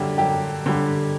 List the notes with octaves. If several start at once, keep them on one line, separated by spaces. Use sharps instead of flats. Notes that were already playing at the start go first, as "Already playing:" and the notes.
Already playing: F#2 D3 G3 G4
F#2 G4
D3 G3